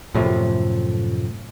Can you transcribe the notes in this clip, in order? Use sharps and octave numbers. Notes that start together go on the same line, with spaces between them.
F#2 A2 C3 F3